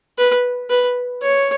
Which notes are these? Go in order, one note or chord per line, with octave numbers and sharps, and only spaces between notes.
B4
B4
C#5